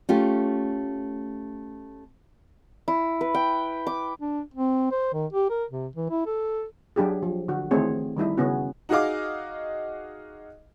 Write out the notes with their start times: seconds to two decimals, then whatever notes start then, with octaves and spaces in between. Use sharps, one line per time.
0.09 A3 C#4 F4 G4
2.88 E4
3.21 B4
3.34 G5
3.87 D6
4.20 D4
4.54 C4
4.91 C5
5.13 D#3
5.33 G4
5.50 A#4
5.71 C3
5.96 E3
6.10 E4
6.26 A4
6.96 F#3 D4 G4 G#4
7.23 F3
7.48 D3 F#4
7.71 D#3 E3 A3 C4 G#4 C#5
8.17 D#3 G3 D#4 E4
8.37 C#3 B3 C#4 F#4
8.89 D#4 F#4 G#4 D#5 F5 D6